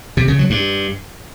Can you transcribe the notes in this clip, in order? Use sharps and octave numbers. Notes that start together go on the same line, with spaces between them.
C3
C#3
F#3
G2